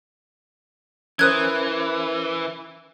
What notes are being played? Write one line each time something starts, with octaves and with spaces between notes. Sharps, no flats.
E3 C#4 A#4 C5 D#6 F#6 G#6